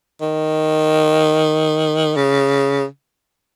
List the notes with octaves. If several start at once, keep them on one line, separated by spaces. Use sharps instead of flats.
D#3
C#3